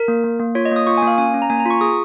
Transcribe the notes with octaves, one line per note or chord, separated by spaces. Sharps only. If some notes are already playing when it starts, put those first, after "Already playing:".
Already playing: A#4
A#3
A#3
A#3
F4 C#5
D#5
A#3 D#6
F4 C#6
G#5
A#3
F5
C#4 G#5
C#4
A#5
A#3 G#5
A#5
F4 C#6
G#4 D#6